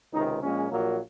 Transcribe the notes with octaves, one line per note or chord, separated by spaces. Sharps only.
C#2 C3 D#3 D#4
A#1 A#2 G#3 C#4
A#1 A#2 F#3 A#3